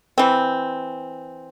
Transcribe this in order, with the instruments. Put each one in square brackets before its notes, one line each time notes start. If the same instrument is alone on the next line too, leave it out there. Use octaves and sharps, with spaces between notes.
[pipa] E3 C4